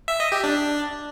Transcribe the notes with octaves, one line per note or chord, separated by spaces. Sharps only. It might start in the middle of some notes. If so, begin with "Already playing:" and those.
E5
D#5
G4
D4